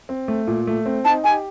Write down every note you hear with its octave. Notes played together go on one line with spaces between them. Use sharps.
C4
A3
A#2
A3
C4
D#4 A5
G4 G#5